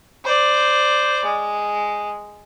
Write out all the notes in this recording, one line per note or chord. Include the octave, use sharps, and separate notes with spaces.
C5 D5
G#3